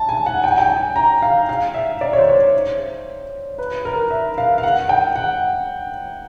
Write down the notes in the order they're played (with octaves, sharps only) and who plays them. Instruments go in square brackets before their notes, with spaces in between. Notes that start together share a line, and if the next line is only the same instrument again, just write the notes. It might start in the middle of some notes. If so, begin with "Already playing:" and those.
Already playing: [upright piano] A5
G#5
F#5
G5
G#5
G5
G#5
A#5
F5
F5
E5
D5
C#5
C5
C#5
C5
B4
A#4
E5
F5
F5
F#5
G5
F#5